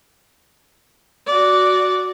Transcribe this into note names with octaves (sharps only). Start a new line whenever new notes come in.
F#4 D5